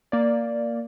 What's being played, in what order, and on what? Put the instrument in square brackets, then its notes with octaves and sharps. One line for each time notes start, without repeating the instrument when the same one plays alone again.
[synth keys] A#3 D5